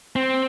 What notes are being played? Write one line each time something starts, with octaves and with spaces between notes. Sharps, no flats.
C4